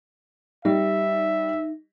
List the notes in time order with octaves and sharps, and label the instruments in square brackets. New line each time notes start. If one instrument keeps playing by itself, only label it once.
[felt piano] G3 [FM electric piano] D#4 [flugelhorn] E5